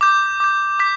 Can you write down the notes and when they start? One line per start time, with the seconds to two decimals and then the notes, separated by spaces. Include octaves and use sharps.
0.01 D6 G6
0.40 D6 G6
0.79 D6 G6 B6